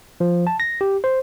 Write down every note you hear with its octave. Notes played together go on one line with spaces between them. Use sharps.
F3
A5
A#6
G4
C5